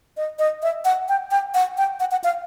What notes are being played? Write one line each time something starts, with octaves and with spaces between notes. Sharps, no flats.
D#5
D#5
E5
F#5
G5
G5
F#5
G5
F#5
F#5
F5